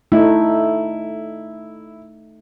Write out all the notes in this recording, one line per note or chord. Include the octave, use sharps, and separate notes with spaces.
A3 D#4 E4